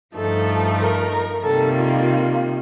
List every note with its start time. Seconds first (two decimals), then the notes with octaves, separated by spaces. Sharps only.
0.15 G2 F3 A3 D#4 A4
0.80 A#4
1.43 C3 D#3 G3 A#3 A4
1.76 F4